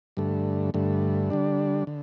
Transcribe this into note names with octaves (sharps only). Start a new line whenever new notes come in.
G2 D3 A3
G2 D3 A3
D3 G3 D4
D3